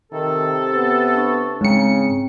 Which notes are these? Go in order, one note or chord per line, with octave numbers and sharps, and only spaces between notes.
C3 D#3 A4
B3
D4 C#6
G#2 C#3 C4 G5 A#5 C#7